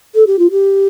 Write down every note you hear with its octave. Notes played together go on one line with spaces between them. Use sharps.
A4
G4
F4
G4